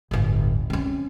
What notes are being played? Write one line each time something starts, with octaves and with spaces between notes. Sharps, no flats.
D1 G1
C4 C#4